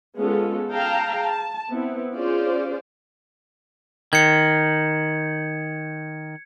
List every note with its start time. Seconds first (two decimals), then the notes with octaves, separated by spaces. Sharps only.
0.18 G#3 B3 C#4 F4 A4
0.72 G#4 F5 G5 A5 A#5
1.21 A5
1.69 B3 C4 E4
2.15 C#4 F4 G#4 C5 D5
4.13 D#3 G#6 C#7